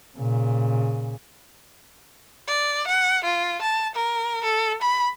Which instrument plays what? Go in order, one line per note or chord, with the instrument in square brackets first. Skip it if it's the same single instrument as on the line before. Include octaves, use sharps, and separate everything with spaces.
[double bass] A#2 C#3
[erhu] D5
F#5
F4
A5
A#4
A4
B5